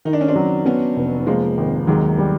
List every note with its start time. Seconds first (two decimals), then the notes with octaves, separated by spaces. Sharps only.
0.05 D#3 D#4
0.13 D4
0.21 C#4
0.28 C4 D4
0.36 F#3
0.66 F#3 B3 C#4
0.96 F1
1.27 F3 G#3 A#3
1.58 G#1
1.87 D#2 F#3 G#3
2.18 G3